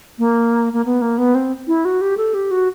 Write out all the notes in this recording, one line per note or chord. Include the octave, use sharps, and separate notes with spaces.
A#3
A#3
B3
A#3
B3
C4
E4
F#4
G4
A4
G4
F#4